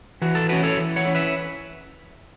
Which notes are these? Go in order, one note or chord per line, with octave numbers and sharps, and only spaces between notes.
E3 F#4
A4
C#4 E4 F#4 B4
A4 C#5
E3
C#5 F#5
C#4 E4
B4 E5